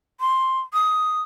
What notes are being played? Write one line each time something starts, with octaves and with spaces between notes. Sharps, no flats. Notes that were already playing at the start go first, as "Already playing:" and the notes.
C6
D#6